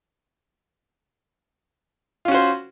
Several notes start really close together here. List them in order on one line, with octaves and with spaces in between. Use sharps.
F4 C#4 F#4 C5